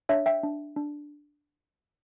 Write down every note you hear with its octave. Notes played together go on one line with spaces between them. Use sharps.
D4 C#5 E5
E5 G5
D4
D4